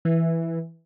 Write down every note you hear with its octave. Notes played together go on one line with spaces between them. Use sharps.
E3